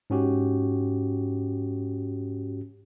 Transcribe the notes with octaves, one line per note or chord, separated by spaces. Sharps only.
G#2 C#4 F#4 G4